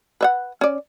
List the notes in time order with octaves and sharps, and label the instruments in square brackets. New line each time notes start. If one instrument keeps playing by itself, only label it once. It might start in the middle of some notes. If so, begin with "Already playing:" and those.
[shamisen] B4 E5 F#5
C#4 D5